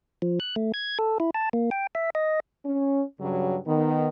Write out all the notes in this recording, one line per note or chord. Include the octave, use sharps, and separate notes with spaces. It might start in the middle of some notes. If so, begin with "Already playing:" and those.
F3
F#6
A3
G#6
A4
E4
A5
A#3
G5
E5
D#5
C#4
G2 C#3 F#3
D#3 B3